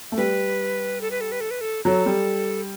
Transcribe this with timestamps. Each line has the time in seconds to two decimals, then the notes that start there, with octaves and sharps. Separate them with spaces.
0.12 A3
0.17 G3 B4
1.01 A4
1.11 B4
1.21 A4
1.32 B4
1.41 A4
1.51 B4
1.61 A4
1.85 F#3 A4
2.06 G3